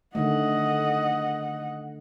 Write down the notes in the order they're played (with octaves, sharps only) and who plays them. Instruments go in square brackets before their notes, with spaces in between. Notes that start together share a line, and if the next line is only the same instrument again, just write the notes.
[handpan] D3 D#3 A3 [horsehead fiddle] D#5 F#5